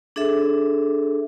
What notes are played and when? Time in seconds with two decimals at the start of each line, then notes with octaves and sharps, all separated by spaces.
0.16 D4 G#4 A4 E5